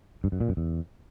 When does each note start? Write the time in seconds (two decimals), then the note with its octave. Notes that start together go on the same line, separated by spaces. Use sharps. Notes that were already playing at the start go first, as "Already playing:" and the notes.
0.24 G2
0.32 F#2
0.40 A#2
0.49 F#2
0.57 E2